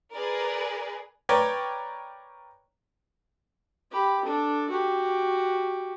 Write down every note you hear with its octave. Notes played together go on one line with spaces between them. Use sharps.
G#4 A#4 B4 D5 G#5
A#4 B4 C#5 D5 G5
G4 B5
D4 A4
F#4 G4